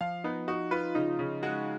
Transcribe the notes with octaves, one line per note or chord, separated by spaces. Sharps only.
F3 F5
B3 D#4
D#4 F#4
F4 B4
C#3 D#4
C#3
G#3 F#4